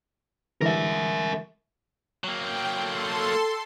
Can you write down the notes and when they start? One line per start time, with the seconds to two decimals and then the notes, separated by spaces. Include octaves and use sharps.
0.62 D3 E3 G#3 A#4 E5
2.24 F#3 A#3 G5
2.72 A4 C6